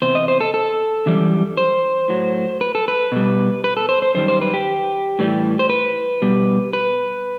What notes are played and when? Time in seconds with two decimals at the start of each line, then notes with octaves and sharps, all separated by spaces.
0.02 E2 C3 C5
0.15 D#5
0.28 C5
0.41 A4
0.54 A4
1.06 F#2 E3 G3
1.57 C5
2.08 A2 F#3
2.61 B4
2.75 A4
2.88 B4
3.12 B2 G3
3.64 B4
3.77 A4
3.89 C5
4.02 C5
4.14 F#2 D#3 G3 C5
4.28 C5
4.41 B4
4.54 G4
5.19 A2 E3 G3
5.59 C5
5.70 B4
6.22 B2 G3
6.73 B4